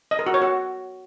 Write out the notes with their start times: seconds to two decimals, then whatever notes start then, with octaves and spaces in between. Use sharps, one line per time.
0.11 D#5
0.19 A#4
0.26 F#4
0.34 C#5
0.42 F#4